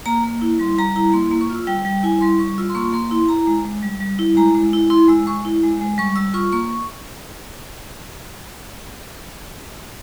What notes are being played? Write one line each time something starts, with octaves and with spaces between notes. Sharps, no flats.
A#3 A#5
A#3
E4
G3 C6
G3 A#5
E4 A#5
A#3 C6
A#3
C#6
F4
E6
G3 G5
G3 G5
E4 G#5
G3 C6
G3 C#6
F4 E6
C6
A#3 C#6
A#3 C6
E4 C6
E4 A#5
G#3
G#3
G3
G3
E4
G#3 A#5
G#3
E4
E4 C6
G#3 E6
G#3 C#6
E4
G#3
G#3
G3 C#6
G3 E6
F4 C#6
A#3 C#6